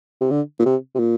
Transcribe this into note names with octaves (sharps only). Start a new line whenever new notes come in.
C3
D3
A#2
C3
C3
A#2